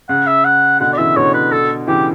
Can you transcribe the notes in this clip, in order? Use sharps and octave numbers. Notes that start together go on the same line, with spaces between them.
C#3 F#5
E5
F#5
B2 D3 F#5
D5
C#3 E3 E5
B2 D3 C#5
B4
A4
C#3 E3 G4